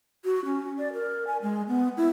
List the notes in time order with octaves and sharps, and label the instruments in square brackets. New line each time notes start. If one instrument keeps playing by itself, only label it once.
[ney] F#4
C#4
D5
A#4
G#5
G#3
B3
E4